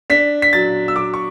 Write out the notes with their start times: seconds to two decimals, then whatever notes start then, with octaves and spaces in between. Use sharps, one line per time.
0.10 D4 B6
0.42 B6
0.53 F#3 A6
0.88 E6
0.96 F#3 D6
1.14 C#6